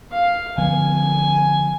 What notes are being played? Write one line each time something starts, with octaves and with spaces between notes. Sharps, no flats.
F5
D3 F3 B3 G#5